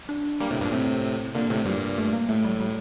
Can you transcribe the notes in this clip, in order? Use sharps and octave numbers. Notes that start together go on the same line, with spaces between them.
D4
G3 A#3
A2 C3
G2 A#2
D4
A2 C3 C4
A#2 D3 A#3
A2 C3 A3
G2 A#2 G3
A3
A#3
A2 A3
G3
G3